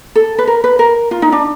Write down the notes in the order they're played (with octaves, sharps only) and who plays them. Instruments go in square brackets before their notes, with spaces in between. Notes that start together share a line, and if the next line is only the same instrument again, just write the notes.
[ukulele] A4
B4
A#4
B4
A#4
F4
D#4
D4